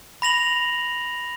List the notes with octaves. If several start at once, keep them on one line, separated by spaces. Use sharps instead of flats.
B5 A#6 F7 F#7